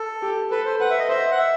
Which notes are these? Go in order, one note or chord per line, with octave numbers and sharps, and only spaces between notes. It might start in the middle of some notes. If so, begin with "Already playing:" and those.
Already playing: A4
G4
A4 B4
C5
B4 F#5
E5
D#5
C5 E5
F#5
E5